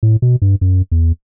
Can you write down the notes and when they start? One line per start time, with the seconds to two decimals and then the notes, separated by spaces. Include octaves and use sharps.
0.03 A2
0.22 B2
0.42 G2
0.61 F#2
0.92 E2